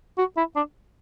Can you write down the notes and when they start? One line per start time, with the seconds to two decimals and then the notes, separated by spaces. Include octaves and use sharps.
0.18 F#4
0.37 E4
0.56 D4